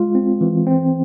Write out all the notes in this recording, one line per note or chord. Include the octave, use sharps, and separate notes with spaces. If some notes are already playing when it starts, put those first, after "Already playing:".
Already playing: G#3 F4
C4
E3
C4